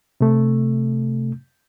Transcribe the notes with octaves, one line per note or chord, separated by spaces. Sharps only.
C3 A3